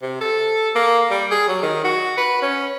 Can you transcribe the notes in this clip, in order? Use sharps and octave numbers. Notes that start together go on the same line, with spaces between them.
C3
A4
A#3
G3
G#4
F#3
D#3
F#4
B4
C#4